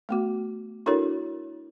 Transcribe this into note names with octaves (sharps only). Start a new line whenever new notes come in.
A3 B3 F#4
D4 E4 F#4 A4 A#4 C#5